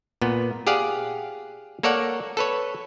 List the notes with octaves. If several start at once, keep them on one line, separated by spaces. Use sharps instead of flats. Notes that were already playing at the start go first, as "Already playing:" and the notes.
A#2 B3
G4 G#4 D5 F5 F#5
A#3 A4 C#5 D5 F#5
A4 B4 C#5